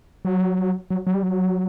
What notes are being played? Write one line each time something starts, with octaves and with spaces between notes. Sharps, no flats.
F#3
F#3
F#3
G3
F#3